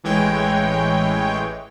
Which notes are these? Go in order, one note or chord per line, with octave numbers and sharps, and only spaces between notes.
A1 E3 G#3 C#5 G5